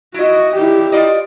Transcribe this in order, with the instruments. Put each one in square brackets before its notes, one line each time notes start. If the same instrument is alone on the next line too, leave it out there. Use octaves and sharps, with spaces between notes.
[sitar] E4 D#5 [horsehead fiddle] F#4
[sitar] A#2 [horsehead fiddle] E4 G4
[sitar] F4 D5 D#5